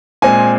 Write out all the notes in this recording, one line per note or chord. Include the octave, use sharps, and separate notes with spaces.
A#2 G#3 C4 G#5